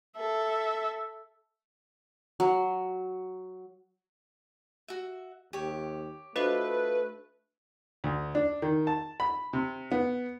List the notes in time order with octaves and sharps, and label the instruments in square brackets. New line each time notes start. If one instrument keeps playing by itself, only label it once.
[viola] A4 E5
[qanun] F#3
[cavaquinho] F#4 E5
[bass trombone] D#2 [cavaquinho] G4 C#5
[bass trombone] A3 [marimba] D4 F#4 C5 [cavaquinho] F4 D#5 F5 [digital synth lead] B4
[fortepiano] D2
D4
D#3
A5
B5
C3
B3